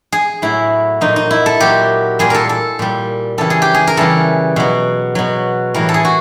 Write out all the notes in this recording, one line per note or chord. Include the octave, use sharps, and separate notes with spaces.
G#4
A2 F#3 E4
A#2 F#3 D#4
D#4
E4
A4
A#2 F#3 G4
A#2 G3 G#4
A4 A#4
A4
A#2 G3
C#3 E3 G3 A4
G#4
G4
G#4
A#4
C#3 E3 G3 A4
B2 F#3
B2 F#3
A2 E3 G3 A#4
A4
G#4
F#4